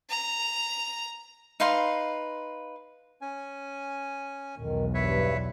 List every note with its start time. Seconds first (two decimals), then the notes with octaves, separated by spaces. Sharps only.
0.10 A#5
1.60 D#4 B4 F5 C6
3.21 C#4 G#5
4.58 B1 E2 D#3
4.94 G2 B4 C#5 E5